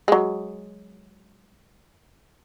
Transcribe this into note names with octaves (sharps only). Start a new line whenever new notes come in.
F#3 G#3